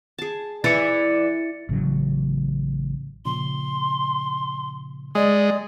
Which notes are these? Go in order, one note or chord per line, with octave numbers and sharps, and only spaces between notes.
G#4 A5
E3 E4 D5 A6 C#7
A1 C#3 F#3
A#2 C#3 F3 C6
G#3 D5 D#5 D#6